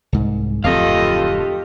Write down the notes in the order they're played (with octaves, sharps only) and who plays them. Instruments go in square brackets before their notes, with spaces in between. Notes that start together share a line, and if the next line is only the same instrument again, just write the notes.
[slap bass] C2 G#2
[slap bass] D1 F2 C4 [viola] F4 A4 [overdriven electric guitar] G4 F5 [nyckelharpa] D#5